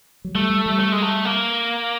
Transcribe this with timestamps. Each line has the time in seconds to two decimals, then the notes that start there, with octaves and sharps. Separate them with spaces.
0.25 F#3
0.35 G3 A3
0.50 G3
0.66 G3
0.80 A3
0.92 G#3
1.02 A3
1.25 A#3